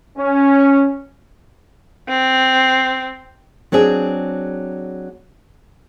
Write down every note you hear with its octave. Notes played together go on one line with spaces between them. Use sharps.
C#4
C4
F#3 C4 D4 G#4